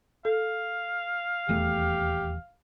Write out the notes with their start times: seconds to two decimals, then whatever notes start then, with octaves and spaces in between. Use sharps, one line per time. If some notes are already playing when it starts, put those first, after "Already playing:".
0.25 A4 F5
1.49 D#1 E2 A3 G4